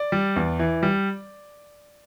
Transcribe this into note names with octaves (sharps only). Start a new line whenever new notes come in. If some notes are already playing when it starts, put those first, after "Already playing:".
Already playing: D5
G3
E2
E3
G3